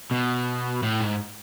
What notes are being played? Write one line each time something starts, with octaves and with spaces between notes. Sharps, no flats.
B2
A2
G#2